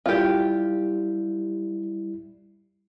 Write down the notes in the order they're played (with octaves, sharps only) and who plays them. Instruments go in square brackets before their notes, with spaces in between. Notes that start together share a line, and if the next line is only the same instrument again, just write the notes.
[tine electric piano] G3 E4 [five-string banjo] F4 G4